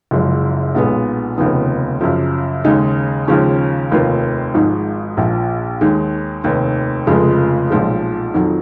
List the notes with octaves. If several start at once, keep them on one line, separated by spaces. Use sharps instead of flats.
F#1 F#2 F3 G#3
B1 A#2 G#3 B3
F1 D#2 C#3 F3 B3
F#2 C#3 F3
D#2 C#3 G#3 D#4
D#2 C#3 F3 G#3 C#4
F1 D#2 D#3 A#3 F4
G#1 G#2 F3 G#3 D#4
A#1 A#2 F3
D#2 D#3 G#3
F1 D#2 D#3
F1 F2 C#3 F3 G#3
B1 A#2 F3 G#3
F2 D#3 F#3